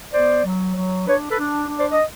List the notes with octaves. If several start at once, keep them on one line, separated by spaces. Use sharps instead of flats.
B3 C5 D5
F#3
F#3
D4 B4 C#5
A4 B4
D4
D4
C5 D5
D#5